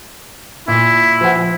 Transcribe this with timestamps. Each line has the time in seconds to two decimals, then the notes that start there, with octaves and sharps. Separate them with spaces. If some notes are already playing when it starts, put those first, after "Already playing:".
0.68 A#2 E4
1.21 F3 C5 F#5